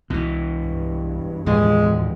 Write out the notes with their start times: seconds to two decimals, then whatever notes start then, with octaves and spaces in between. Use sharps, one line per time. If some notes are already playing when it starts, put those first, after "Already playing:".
0.10 C2 B2 E3
0.61 G2
1.46 E1 D#2 A2 F3 G#3